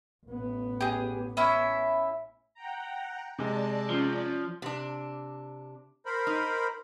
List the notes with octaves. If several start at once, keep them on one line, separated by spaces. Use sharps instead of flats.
A1 B3
G4 G#4
C#4 E4 E5
F#5 G5 A#5
C3 G#3 D5 A5
F3 C#4 D5
C3 D4
A#4 C5 B5
D#4